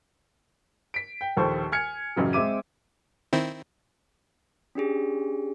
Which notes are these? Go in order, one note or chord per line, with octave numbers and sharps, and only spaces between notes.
B6 D7
G5
A#1 D#2 A4 C5 C#6
G#5 F6 G#6 C#7
A1 F#2 C#3 F#3
G#3 C4 E5 D6 D#7
D#3 C4 E4
C#4 D4 G4 G#4